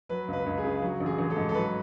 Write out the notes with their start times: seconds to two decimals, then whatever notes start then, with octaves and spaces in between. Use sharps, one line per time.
0.09 F#3 B4
0.28 C#2
0.33 B4
0.46 C#2
0.58 G#4
0.64 C#3
0.82 F#3 F#4
1.00 A1
1.06 G#4
1.18 A1
1.30 A4
1.36 G#2
1.49 A4
1.54 F#3 B4